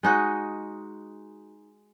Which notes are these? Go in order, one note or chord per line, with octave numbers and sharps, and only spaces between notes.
G#3 D#4 F#4